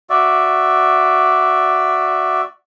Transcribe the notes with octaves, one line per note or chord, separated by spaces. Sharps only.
F#4 D5 E5